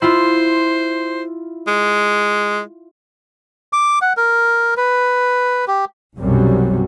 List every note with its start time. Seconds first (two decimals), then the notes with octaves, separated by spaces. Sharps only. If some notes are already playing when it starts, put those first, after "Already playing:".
0.02 E4 F4 C5
1.67 G#3
3.73 D6
4.02 F#5
4.17 A#4
4.77 B4
5.68 G4
6.18 B1 F#2 C3 F#3 G3